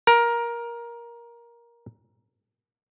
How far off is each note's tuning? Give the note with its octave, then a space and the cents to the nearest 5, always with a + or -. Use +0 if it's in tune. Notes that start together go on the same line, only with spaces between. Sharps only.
A#4 +15